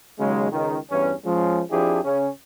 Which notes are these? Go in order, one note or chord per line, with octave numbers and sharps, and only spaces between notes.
D#2 C#3 F#3 G#3
C#2 D#3
E2 G2 E3 C#4
F3 G#3 C#4
F2 F3 D4 E4 G4 G#4
C#3 C#4